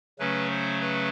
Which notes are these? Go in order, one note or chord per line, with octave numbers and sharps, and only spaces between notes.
C#3 F#3 A3 C#4 B4
C5
B4